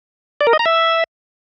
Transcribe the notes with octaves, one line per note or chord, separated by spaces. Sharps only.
D5
A#4
D#5
A#5
E5